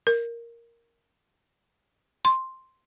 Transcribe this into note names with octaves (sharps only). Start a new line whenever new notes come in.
A#4
C6